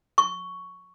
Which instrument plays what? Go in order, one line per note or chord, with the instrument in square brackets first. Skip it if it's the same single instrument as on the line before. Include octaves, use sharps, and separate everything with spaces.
[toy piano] C#6